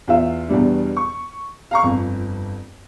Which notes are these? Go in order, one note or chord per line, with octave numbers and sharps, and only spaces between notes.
E2 F4 E5
E2 B2 G3 D4
C#6
F5 A#5 C#6
G1 F2